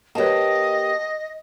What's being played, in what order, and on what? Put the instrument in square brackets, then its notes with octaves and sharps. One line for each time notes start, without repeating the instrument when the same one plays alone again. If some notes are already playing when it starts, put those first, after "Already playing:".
[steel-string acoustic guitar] A#3 G4 [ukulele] B4 C#5 A5 [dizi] D#5